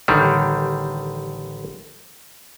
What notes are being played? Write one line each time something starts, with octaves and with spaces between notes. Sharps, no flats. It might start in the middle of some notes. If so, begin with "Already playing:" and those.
A1 D3 D#3 G3